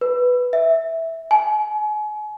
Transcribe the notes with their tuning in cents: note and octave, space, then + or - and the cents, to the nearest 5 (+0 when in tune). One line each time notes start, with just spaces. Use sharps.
B4 +0
E5 -10
G#5 +35